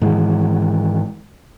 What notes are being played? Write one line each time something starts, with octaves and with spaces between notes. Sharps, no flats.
G#2 D#3 E3 G#3